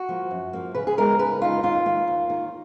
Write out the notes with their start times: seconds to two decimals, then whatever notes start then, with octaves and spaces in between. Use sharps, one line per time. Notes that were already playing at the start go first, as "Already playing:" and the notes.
Already playing: F#4
0.09 F3 A#3
0.31 F#2
0.53 F3 A#3
0.75 C#3 B4
0.87 G#4
0.97 G#3 B3 D#4 A#4
1.19 C#3 B4
1.41 G#3 B3 D#4 F4
1.63 D#2 F4
1.86 D#3 A#3
2.08 D#2
2.30 D#3 A#3